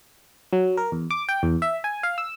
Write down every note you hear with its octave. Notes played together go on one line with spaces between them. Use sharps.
F#3
A#4
E2
D6
G5
E2
E5
G#5
F5
E6